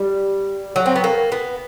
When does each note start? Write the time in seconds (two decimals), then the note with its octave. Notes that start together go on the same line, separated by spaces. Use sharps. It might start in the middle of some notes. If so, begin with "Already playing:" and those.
Already playing: G3
0.76 F#3
0.86 C4
0.96 B3
1.04 A#3
1.32 B3